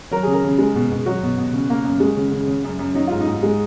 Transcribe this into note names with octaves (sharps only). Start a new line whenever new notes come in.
F#3 A#4
C#3 G#4
A#4
C#3
G#3
B2
B2
F#3 F#4
B2
B2
C#3
A#3
F#2
G#3
C#3
C#3
C#3
F#2
F#2
F#3 D#4
G#2 F4
D#4
G#2
G#3